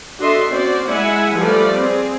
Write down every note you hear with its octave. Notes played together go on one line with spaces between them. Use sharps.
D4 F#4 A4 D#5 E5 C6
C4 C#4 F#4 C5 D5
G#3 E4 E5 F#5 G#5
F3 G3 A3 B4 D5
C4 G#4